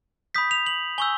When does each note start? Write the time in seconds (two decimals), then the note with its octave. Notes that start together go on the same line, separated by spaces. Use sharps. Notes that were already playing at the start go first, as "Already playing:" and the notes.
0.35 B5 D#6 G6 B6
0.51 F7
0.66 F#7
0.98 G#5 C#6 E6 G6 G7